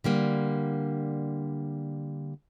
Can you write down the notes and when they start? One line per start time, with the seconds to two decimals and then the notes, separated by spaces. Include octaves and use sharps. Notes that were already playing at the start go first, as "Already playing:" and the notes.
0.04 D3 G3 A#3